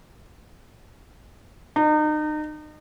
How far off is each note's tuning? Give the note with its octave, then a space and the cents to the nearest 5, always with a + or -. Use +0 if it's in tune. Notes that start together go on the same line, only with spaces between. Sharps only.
D#4 -35